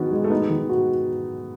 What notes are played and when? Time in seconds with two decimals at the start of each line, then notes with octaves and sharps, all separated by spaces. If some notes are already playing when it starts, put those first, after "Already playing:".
Already playing: D#3 G#3 B3 C#4 D#4 F#4
0.11 G#3
0.24 A3
0.30 B3 D#4
0.50 D#3
0.69 F#4